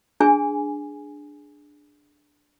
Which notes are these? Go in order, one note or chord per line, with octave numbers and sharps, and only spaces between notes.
D4 G#4 G#5